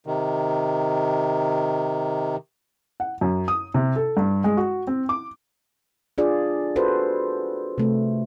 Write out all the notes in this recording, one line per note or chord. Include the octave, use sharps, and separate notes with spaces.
C3 D#3
F#5
F#2
D#6
C3
A4
G2
G#3
F#4
C4
D6
D4 F4 G#4 D5
F#4 A4 B4 C5
C3 A3